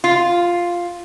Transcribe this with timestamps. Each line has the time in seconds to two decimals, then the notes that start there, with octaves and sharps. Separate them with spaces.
0.04 F4